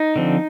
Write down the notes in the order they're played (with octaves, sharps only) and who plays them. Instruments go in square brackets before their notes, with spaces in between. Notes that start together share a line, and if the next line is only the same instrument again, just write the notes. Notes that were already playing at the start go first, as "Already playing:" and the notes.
Already playing: [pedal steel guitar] D#4
D3 F3 C4